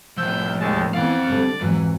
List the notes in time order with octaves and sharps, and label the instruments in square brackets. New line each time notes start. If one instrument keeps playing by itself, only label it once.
[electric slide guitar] A2 F3 [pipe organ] E6 G6
[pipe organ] D#2 G#3 A5
[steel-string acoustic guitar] E3 B3 [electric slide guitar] C4 F5 [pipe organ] D5
[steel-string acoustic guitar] D3 G3 C5
[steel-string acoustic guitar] F2 G#2 F#3 [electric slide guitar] E3